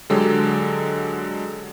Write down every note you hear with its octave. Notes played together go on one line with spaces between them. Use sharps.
D3 F#3 G#3 G4 A4